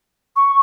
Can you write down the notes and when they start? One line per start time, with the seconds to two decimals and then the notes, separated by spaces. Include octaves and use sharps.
0.36 C#6